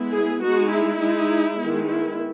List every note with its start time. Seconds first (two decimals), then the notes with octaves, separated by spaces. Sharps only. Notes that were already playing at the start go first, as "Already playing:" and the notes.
Already playing: G#3 B3 E4
0.14 G#4
0.42 G#3 D#4 F#4
0.72 E4
1.01 G#3 D#4
1.60 D#3 G#3 B3
1.89 E4